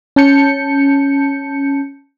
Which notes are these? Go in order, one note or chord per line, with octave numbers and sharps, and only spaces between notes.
C#4 A5 G6 C#7